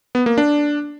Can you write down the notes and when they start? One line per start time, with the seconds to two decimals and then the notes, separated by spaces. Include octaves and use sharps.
0.15 B3
0.26 A#3
0.38 D4